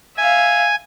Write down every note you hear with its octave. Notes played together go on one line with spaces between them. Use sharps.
E5 F5 G#5